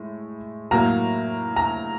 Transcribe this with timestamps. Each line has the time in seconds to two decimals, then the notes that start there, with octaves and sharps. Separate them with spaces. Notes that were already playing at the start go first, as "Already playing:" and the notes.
Already playing: A2 G#3
0.71 A2 F#3 A#3 A#5
1.56 A#5